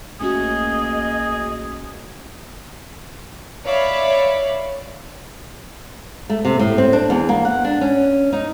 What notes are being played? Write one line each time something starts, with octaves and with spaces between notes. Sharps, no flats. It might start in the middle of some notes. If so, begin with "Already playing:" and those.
A#1 A3 A#3 C#4 F#4 G#4 D#5
C#5 D5 E5 F5 B5
A3
C3
A2
C4
D4
E2
A#3
F#5
D4
C#4
D#4